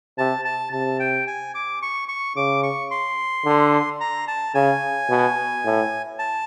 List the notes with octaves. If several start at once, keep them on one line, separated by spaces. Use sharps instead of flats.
C3 A5
A5
C3 A5
G5
G#5
D6
C#6
C#6
C#3 D6
C#6
C6
D3
A#5
A5
C#3 G#5
B2
A2
A5